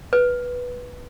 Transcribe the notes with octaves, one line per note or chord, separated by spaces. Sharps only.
B4